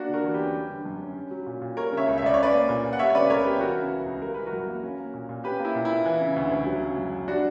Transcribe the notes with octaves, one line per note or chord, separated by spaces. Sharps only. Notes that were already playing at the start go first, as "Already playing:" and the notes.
Already playing: A#3 D4 F#4
D3
F#4 A#4
E2
G4 B4
C#4
G3
D3
F#2
C#4
C#4
F#3
A#2
A#2
G3 A#4 C#5
C#3
C#5 E5
C#2
E5
C#2 D5
C#5
C#4 B4 D5
A#3
A#2
A#2
F#5
G3 C#5 E5
C#5
C#3 B4 D5
C#2 A#4 C#5
B3 G4 B4
E3 F#4 A#4
C#3
C#2
C#2
G3 A#4
E3 B4
F#4 A#4
F#2
A#3
C#4
A#3
A#2
A#2
C#4 G4 B4
A#3
E4
A#2
E4
A#2
E3
C#3
D2
D2
F#3
C#3
F#2
F#2
G3 D4 F#4